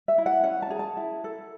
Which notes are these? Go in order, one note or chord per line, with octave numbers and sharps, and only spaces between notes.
E5
E4
F#5
C#4 F#5
A5
G#4
A5
E4
A4